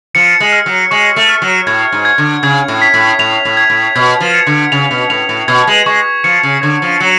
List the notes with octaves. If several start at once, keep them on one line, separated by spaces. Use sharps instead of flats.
F3 C#7
G#3
F6
F#3
G#3 C#6
A3
F6
F#3
A2 G#6
G#2
G#6
D3
C#3 G#6
A2
B6
A2
A2 F7
A2
G#6
A2
B2 G#6
F3
C#7
D3
C#3 F7
B2
A2 F7
A2
B2 G#6
G#3
G#3 C#6
F3 C#7
C#3
D3 G#6
F3
F#3 C#7